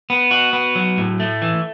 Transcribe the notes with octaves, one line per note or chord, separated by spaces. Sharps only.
B3
F#4
B3
F#3
A2
A3
E3